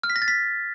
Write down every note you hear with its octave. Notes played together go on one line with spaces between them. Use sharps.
F6
B6
A#6
A6
B6